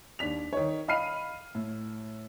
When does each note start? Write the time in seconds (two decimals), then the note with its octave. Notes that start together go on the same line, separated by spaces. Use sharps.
0.19 D#2 D4 B6 F7
0.53 D#3 C#5
0.88 D#5 F5 B5 F6 C7 D#7
1.55 A2